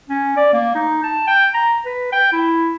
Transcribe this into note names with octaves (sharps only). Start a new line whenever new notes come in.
C#4
D5
A#3
D#4
A5
G5
A#5
B4
G5
E4